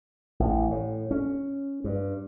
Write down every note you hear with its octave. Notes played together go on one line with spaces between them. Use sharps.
A1
A2
C#4
G2